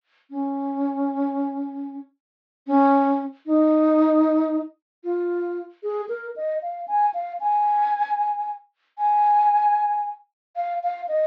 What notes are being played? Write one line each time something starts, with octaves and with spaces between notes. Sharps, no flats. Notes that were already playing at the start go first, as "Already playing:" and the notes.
C#4
C#4
D#4
F4
G#4
A#4
D#5
F5
G#5
F5
G#5
G#5
F5
F5
D#5